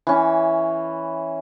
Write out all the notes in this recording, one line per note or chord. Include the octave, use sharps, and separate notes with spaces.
E3 C#4